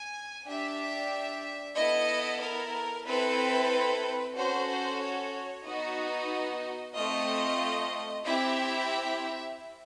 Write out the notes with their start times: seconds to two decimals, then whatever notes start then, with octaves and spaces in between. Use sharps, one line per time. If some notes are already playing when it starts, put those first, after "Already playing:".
Already playing: G#5
0.47 D4 G4 E5
1.76 B3 E4 A4 D#5
2.42 A#4
3.07 C4 E4 A4 B4
4.36 C#4 F#4 A4 C5
4.68 C5
5.01 C#5
5.66 B3 D#4 F#4 D#5
6.96 A3 C4 F4 D#5
8.26 C4 E4 G4 E5